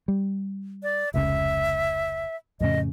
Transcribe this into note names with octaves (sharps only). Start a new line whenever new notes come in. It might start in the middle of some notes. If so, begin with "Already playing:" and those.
G3
D5
F1 C#2 C#3 E5
F2 A2 C#3 D#5